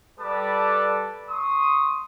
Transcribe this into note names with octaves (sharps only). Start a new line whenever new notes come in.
G3 A4 B4 A5 D6
C6 C#6 D#6